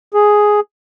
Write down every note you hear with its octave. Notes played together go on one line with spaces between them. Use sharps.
G#4